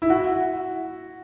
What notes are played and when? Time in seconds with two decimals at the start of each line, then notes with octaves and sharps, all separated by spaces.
0.02 E4
0.10 F#4